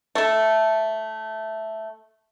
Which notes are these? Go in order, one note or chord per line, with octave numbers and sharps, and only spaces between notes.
A3 A4